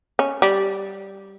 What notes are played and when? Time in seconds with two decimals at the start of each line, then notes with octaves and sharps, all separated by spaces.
0.19 C#4
0.42 G3